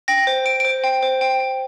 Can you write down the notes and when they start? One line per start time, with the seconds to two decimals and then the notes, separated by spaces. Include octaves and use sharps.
0.08 G5 A#6
0.27 C5
0.45 C5 D7
0.60 C5 D7
0.84 G5
1.03 C5
1.21 G5
1.40 G5